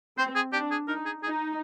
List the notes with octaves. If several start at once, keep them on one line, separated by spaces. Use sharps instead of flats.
C4 C5
G#4
D4 G4
G#4
D#4 A#4
G#4
D#4 G#4